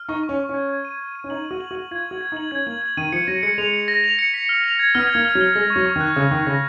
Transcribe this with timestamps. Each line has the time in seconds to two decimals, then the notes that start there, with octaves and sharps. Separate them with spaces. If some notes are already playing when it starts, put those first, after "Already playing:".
Already playing: F6
0.09 D#4 C#6
0.23 C#6
0.29 C#4
0.40 C#6
0.49 C#4 G#6
0.69 G#6
0.85 D#7
1.00 G#6
1.15 D#7
1.24 C#4
1.30 D#4 F#7
1.45 D#7
1.51 F#4
1.61 F#7
1.71 F#4
1.75 F#7
1.91 F4 G#6
2.06 F#4 F#7
2.21 G#6
2.32 D#4
2.37 F#7
2.51 C#4 G#6
2.67 A#3 F#7
2.82 F#7
2.97 D#3 D#7
3.12 F3 C#7
3.28 F#3 A#6
3.43 G#3 C#7
3.58 G#3 F7
3.74 C#7
3.88 A#6
4.04 F7
4.19 C#7
4.34 B6
4.49 F6
4.64 F7
4.79 G#6
4.95 B3 F6
5.10 G#6
5.15 A#3
5.25 F6
5.35 F#3
5.41 F6
5.55 G#3 A#6
5.70 C#6
5.76 F#3
5.86 C#6
5.96 D#3
6.01 F#6
6.16 C#3 F#6
6.31 D#3 C#6
6.47 C#3 A#6